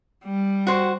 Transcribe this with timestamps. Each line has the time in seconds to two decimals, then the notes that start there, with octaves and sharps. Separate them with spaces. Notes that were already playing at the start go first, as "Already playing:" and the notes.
0.25 G3
0.67 F#4 C5